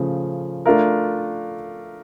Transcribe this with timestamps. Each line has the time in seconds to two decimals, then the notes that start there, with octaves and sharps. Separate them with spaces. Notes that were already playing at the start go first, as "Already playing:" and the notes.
Already playing: C#3 F3 A3
0.66 A3 D4 F4 A#4